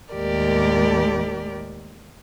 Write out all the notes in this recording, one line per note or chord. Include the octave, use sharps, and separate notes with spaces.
D#2 A2 G#3 G4 A#4 D5